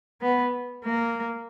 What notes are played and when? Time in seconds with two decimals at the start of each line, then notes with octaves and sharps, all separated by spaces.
0.21 B3
0.85 A#3